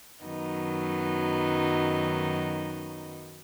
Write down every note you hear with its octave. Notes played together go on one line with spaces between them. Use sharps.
F#2 D#3 F#3 B3 D#4